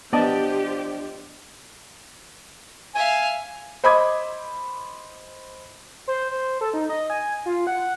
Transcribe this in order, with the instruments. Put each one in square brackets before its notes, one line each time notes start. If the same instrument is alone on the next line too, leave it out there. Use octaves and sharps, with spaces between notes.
[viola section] F3 G4 [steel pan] B3 A5 [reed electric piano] D4 D5 D#5
[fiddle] E5 F5 [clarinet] G#5
[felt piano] C5 D#5 B5 D6 D#6 G#6
[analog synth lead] C5
C5
A4
D#4
D#5
G#5
F4
F#5